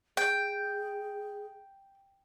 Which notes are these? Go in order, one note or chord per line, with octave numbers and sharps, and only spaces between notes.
G#4 G5